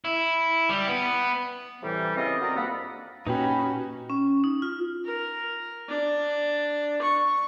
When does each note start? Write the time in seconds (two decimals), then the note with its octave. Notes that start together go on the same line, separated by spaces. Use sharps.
0.05 E4
0.69 G3
0.87 B3
1.83 A2 C3 E3 G3
2.16 C#3 E3 C4 F4 D#5
2.41 C4 F#4 A#4 D5 D#5 A#5
2.56 G2 F3 A#3 A4 F#5 B5
3.27 A#2 C#4 D#4 F#4 G4 B4 G5 B5
4.10 C#4
4.44 D#4
4.62 F4
5.05 A#4
5.89 D4
7.02 C#6